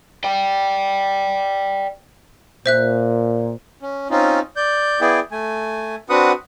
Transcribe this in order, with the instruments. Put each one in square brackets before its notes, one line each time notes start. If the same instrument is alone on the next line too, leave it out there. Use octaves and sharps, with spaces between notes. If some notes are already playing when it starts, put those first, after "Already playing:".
[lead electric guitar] D5 G5
[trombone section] A#2 [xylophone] C5 E5 F#6
[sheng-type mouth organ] C#4
C4 C#4 D#4 F4
D5 G6
B3 E4 G#4 D5 G5
A3 G#5
C4 D4 F#4 B4 F#5 D#6